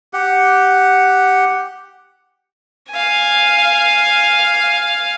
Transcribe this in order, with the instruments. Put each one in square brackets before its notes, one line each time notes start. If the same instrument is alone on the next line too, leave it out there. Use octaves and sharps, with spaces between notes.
[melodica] G4 F#5
[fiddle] F5 G#5